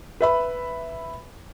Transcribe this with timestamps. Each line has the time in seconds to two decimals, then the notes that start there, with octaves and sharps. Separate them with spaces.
0.21 B4 E5 B5